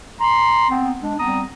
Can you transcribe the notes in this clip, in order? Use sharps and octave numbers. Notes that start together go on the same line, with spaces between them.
A#5 C6
B3 C4
G#3 D4
G3 B3 C4 A#5 D#6